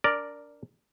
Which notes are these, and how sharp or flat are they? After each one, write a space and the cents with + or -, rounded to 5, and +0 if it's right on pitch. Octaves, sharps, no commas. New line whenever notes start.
D4 -25 A#4 +0 D5 +0